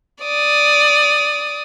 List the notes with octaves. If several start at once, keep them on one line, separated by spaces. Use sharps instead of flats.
D5 D#6